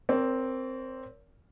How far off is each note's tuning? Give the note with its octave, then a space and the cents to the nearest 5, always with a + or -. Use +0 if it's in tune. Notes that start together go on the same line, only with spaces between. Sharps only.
C4 +0 A#4 +0 C#5 +45